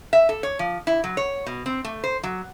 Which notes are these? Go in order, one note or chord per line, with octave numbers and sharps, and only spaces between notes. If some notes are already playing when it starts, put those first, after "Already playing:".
E5
A4
C#5
F3
E4
F#3
C#5
B2
C4
A3
C5
F#3